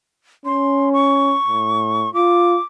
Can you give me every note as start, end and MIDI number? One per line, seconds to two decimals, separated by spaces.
0.46 1.36 61
0.46 0.89 84
0.94 2.12 85
1.47 2.08 45
2.14 2.58 65
2.14 2.62 86